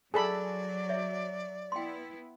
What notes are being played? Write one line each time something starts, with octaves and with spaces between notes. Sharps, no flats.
F#3 G#4 A4 D5 G#5 B5
C#5 E5
B3 E4 G5 C6